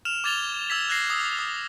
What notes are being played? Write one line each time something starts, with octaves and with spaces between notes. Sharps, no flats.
F6 E7 F7
D6 G#6 A6 F7 G7
E6 G#6 B6
E6 F#6 G#6 A#6 C7
D#6 E6
D#6